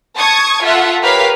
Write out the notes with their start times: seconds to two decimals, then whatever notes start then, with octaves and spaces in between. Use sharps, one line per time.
0.16 A5 C#6 D#6 G#6
0.62 F4 A4 E5 F#5
1.02 G4 A#4 B4 C#5 F5 B6